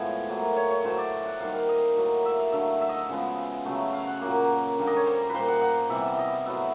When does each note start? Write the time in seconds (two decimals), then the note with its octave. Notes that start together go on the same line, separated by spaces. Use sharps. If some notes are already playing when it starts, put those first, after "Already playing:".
Already playing: A2 F3 G#3 B3 C#5
0.29 A2 F#3 A#3
0.56 C#5
0.71 C#5
0.85 A2 F#3 A3 C5
0.98 D5
1.26 F#5
1.40 D#3 G3 A#3 F5
1.54 F5
1.69 D#5
1.96 A2 F#3 A#3
2.25 E5
2.39 F5
2.52 D3 F#3 A3 E5
2.81 E5
2.89 D#5
2.96 E5
3.09 C#3 F3 G#3 B3
3.65 C#3 F#3 A3
3.93 F5
4.07 F#5
4.22 A#2 F#3 A#3
4.78 D3 G3 A#3
4.87 D#5
4.96 C#5
5.06 C5
5.30 A#2 G3 A#3 B4 C5
5.48 F#5
5.61 F#5
5.89 C3 E3 G3 B3 E5
6.19 D#5
6.46 A2 F#3 B3 E5